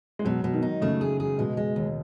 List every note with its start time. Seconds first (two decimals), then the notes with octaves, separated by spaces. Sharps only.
0.19 G#3
0.25 B2 F#3
0.44 B2
0.54 D#3
0.62 D#4
0.81 C#3 A3
1.01 G#4
1.20 G#4
1.38 B2 G#3
1.57 G#3
1.76 D#2